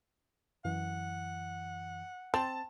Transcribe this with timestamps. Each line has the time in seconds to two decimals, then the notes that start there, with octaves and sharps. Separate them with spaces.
0.65 F#2 E3 F#5
2.34 C4 A5